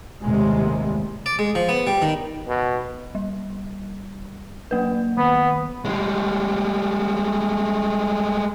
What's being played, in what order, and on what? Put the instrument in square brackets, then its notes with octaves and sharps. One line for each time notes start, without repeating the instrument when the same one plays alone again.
[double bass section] D#2 A2 C3 G3 G#3 A#3
[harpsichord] D5
G#3
F3
B3
G3
D#3
[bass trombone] B2
[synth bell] G3
F#3 A#3 B4
[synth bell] D#3 [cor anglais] B3
[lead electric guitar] G3 G#3